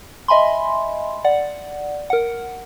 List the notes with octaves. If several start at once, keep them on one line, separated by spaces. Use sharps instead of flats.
D#5 E5 G#5 B5 C6
D5 F#5
A#4 F#5